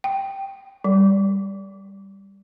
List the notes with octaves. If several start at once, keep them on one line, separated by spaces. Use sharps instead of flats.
G5
G3